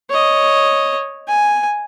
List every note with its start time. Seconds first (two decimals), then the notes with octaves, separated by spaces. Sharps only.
0.10 C#5 D#5
1.28 G#5